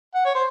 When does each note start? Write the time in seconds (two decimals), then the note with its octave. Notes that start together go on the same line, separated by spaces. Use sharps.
0.14 F#5
0.25 C#5
0.35 C5